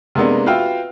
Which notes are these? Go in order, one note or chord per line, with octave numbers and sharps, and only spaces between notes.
C3 G#3 A#3 B3 D4
F4 F#4 B4 E5 F5 G5